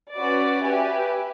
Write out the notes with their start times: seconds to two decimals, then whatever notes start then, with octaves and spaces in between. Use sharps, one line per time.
0.15 C#4 F#4 B4 D5
0.63 G4 B4 E5 G#5